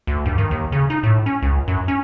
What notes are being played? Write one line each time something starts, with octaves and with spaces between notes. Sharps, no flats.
D2
G2
D#3
D#2
C#3
D#4
A2
C#4
C#2
F#2
C#4